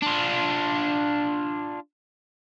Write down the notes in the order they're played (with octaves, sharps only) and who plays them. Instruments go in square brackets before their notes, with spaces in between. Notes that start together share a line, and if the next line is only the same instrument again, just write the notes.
[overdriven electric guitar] D4 F4